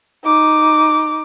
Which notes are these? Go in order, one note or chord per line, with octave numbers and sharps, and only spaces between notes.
D#4 D6